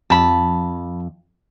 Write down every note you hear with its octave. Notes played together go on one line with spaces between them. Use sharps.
F2 A5 B5